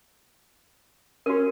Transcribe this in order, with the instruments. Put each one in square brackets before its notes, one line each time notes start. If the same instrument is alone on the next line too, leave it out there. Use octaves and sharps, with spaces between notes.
[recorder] C#4 [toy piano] F#4 A#4